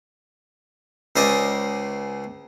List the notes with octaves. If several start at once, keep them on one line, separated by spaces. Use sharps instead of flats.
C#2 C#3 C5 D5 D#5 G#5